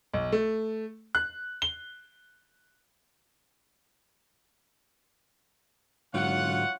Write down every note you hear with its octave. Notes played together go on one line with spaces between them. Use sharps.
B1
A3
F#6
G7
G#2 D3 F#3 F4 C#5 F#5